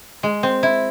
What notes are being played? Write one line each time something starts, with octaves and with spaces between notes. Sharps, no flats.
G#3
C4
E4